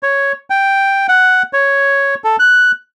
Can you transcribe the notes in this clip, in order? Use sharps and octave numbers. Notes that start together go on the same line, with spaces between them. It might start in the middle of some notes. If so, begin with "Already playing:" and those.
C#5
G5
F#5
C#5
A4
F#6